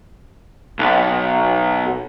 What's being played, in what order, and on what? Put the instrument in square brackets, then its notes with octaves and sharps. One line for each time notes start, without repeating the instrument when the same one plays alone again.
[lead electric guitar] B1